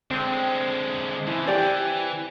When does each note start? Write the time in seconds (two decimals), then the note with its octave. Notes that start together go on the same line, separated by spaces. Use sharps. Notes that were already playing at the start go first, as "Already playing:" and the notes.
0.11 D3 G#3 C4
1.27 E3 F3 E4
1.47 G4 D5
1.61 E3